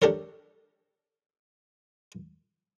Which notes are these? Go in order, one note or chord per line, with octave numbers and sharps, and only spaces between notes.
D4 G4 A4 A#4 C#5